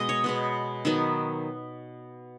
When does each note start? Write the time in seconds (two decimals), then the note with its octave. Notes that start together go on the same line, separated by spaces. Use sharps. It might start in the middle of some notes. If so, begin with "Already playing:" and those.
Already playing: B2 G#3 D#5
0.09 C#5
0.24 B2 G#3 B3
0.85 D#3 F#3 B3